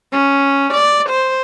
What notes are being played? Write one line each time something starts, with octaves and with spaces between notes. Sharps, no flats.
C#4
D5
C5